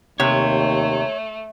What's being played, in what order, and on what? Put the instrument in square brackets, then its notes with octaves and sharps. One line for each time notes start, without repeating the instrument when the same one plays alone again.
[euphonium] D#2 [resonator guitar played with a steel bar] C3 [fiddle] A3 [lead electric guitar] C#5